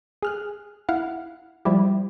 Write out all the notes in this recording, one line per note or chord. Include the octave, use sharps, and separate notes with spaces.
G#4 F6 F#6
E4 F5 F#5
F3 G3 E4 G4